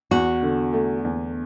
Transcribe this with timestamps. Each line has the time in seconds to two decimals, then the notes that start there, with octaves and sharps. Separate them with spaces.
0.11 E2 F#4
0.42 D3
0.73 A3
1.05 E2